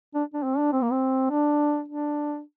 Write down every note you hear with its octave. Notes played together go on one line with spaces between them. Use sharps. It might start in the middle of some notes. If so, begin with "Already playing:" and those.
D4
D4
C4
D4
C4
A#3
C4
D4
D4